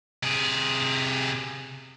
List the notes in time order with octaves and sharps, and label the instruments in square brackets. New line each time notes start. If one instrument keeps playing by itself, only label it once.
[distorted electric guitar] C3 G#4